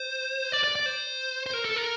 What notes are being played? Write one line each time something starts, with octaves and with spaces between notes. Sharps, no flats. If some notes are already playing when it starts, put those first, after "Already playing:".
Already playing: C5
D5
D5
D5
C5
C5
A#4
A4
A#4